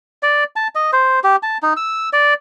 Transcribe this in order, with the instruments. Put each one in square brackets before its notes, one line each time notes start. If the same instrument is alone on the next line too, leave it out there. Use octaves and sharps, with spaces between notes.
[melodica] D5
A5
D#5
C5
G4
A5
D#4
E6
D5